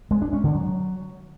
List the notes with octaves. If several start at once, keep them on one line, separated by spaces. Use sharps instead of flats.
G#3
D4
C#4
D3
F#3